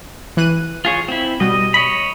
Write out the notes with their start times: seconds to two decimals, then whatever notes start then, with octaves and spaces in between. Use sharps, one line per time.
0.37 E3 F#6 D#7
0.85 F4 G#4 C#5
1.08 C4 E4
1.40 B2 G3 D#5
1.74 C#5 D#5 B5